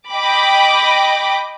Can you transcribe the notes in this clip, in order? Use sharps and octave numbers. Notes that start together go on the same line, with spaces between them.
D#5 G5 B5 D6